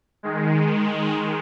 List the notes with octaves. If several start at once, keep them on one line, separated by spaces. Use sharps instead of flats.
D#3 G#3